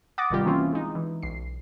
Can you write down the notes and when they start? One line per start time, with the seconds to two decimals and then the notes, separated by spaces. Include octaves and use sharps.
0.18 F#5 D6 D#6 A6 A#6
0.30 G#1 C3 D#3 G3 F4 G4
0.44 E3 A#3 C4 C#4 E4 F4
0.73 G#3 D#4
0.95 E3
1.23 B1 C7